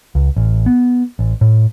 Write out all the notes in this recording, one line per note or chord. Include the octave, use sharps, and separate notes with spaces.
C#2
A1
B3
A1
A2